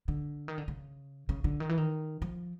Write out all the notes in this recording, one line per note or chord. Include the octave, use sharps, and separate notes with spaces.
D3
D#3
D3
C#3
C#3
D3
D#3
E3
D#3
F3